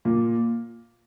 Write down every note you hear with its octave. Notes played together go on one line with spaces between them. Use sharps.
A#2